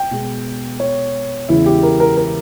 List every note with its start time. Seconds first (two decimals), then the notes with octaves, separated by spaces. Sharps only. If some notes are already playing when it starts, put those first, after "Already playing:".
Already playing: G5
0.11 B2 G#3 B3
0.80 C#5
1.48 E2 C#3 G#3 B3 E4
1.66 G4
1.83 A#4
2.00 A#4
2.17 A#4